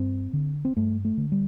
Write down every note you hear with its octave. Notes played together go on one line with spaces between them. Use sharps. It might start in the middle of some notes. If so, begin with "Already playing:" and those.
Already playing: G2 C4
D3
C4
G2 A3
A3
D3
G3